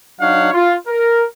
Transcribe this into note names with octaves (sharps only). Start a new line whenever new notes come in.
F#3 D4 D#4 C#5 F5 F#5
F4
A#4